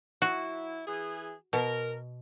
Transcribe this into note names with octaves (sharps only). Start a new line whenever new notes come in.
F#3 E4 F#4
E3 G#4
B2 A#4